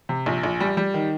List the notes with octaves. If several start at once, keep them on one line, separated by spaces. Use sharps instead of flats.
C3
A#1
A#1
G3
G3
D#3